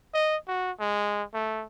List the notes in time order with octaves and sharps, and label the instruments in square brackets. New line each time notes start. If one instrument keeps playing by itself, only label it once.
[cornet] D#5
F#4
G#3
A3